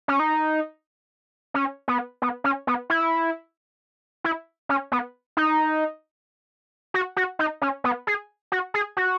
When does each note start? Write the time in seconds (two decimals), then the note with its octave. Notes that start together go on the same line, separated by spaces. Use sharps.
0.08 C#4
0.20 D#4
1.54 C#4
1.88 B3
2.22 B3
2.44 C#4
2.67 B3
2.90 E4
4.24 E4
4.69 C#4
4.92 B3
5.37 D#4
6.94 F#4
7.17 F#4
7.39 D#4
7.62 C#4
7.84 B3
8.07 G#4
8.52 F#4
8.74 G#4
8.97 F#4